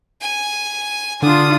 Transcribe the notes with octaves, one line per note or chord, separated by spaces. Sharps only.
G#5
D3 D4 F4 D#6